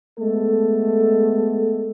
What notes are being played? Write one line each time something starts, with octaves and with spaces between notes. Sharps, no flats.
G#3 A3 B3 A4